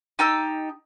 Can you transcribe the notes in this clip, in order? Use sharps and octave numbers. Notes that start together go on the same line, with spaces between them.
D#4 G4 A5 E6